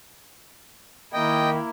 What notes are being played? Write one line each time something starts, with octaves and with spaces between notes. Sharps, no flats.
D#3 A#3 E4 D#5 G5